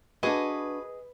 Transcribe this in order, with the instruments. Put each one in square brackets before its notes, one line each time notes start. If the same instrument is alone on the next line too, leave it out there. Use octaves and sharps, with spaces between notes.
[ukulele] D4 F#4 [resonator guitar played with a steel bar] G#4 D#5 [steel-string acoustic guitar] B4